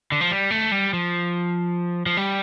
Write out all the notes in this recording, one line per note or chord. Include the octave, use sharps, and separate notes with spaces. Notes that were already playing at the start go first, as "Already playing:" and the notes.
D3
F3
G3
A3
G3
F3
F3
G3